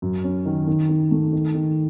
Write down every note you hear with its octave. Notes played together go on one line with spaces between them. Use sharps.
F#2
C#4
D#3
D#3
D#3
A3
D#3
D#3